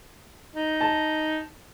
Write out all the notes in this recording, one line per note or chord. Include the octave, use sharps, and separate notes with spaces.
D#4
A5